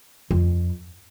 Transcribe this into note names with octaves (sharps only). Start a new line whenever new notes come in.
F2